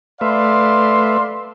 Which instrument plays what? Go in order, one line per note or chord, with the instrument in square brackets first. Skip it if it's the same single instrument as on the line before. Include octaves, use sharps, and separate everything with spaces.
[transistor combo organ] A3 B4 E5 [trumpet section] D5 F5 C6